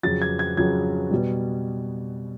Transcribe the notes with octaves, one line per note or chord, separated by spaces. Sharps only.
F2 C#3 F#3 A6
G#6
G#6
F2 C#3 F#3 G#6
B2 G3